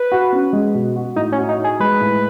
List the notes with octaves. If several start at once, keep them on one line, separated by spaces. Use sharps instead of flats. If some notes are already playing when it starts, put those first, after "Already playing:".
Already playing: B4
F#4
C#4
G#3
B2
F#4
A2 D#4
C#4
F#4
D#4
D#4
G#4
G#3 B4
A2